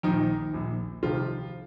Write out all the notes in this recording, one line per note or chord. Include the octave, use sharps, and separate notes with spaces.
A#1 A#2 D#3 F3 D#4
A#1 A#2 F3
C2 C3 D#3 F3 F4